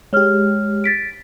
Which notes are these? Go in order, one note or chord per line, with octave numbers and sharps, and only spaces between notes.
G#3 G4 C#5 F6
A6 B6 D7